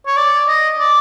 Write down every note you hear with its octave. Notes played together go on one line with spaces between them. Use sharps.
C#5
D5
D#5
D5